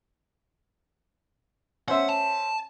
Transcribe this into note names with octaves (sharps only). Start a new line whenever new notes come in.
C#4 C5 E5 F#5
A5